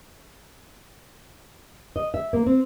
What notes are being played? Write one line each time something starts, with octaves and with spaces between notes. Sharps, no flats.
D#5
E5
A#3
C4